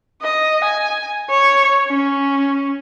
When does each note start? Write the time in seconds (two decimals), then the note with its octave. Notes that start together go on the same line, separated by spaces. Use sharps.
0.22 D#5
0.64 G#5
1.30 C#5
1.88 C#4